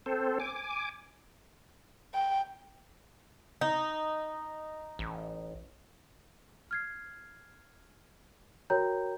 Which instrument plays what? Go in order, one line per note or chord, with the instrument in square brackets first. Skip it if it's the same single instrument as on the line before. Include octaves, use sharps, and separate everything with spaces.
[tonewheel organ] C4 A4 C5
G#5 D6
[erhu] G5
[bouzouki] D#4
[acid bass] A1
[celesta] F6 G#6 C7
F#4 A#4 C#5 G5 A#5 G6